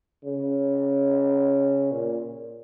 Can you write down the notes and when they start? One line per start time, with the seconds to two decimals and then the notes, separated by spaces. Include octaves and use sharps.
0.24 C#3
1.92 A#2